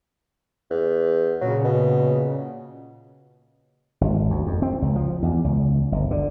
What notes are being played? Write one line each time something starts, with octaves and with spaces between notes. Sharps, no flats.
E2
A#2 C#3 F#3
B2
G#1
D2
F2
C4
C#2
F3
E2
C#2
G1
D3